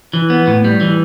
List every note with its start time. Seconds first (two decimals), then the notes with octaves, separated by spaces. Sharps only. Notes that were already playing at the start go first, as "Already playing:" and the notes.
0.13 E3
0.30 B3
0.47 A2
0.64 G3
0.81 E3